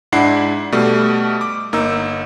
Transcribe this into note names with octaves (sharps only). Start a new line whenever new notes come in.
G#2 D4 E4 F#5 C7
B2 G3 A3
D6
G1 A#3 D#4 E6